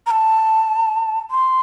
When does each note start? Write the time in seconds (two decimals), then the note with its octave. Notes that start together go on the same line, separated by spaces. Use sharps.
0.07 A#5
0.11 A5
1.31 C6